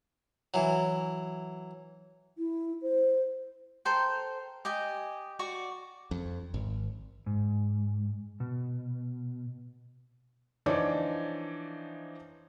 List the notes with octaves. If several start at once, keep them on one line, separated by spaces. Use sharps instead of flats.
E3 F#3
E4
C5
A4 A#4 C5 G5
G4 D#5 G#5
F#4 D5 C#6
F2
G#1
G#2
B2
E3 F3 D4 D#4 C#5 D5